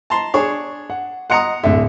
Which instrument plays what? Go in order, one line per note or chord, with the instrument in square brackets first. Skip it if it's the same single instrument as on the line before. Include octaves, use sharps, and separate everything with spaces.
[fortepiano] A5 A#5 C6
D4 G#4 C#5
[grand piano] F#5
[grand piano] D#5 C6 C#7 [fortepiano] F#5 A#5 D#6
[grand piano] D1 A2 E5 [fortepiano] D3